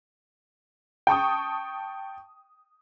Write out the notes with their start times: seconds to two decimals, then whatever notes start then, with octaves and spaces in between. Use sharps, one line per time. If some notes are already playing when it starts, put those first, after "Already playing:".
1.07 G5 A5 C#6 D#6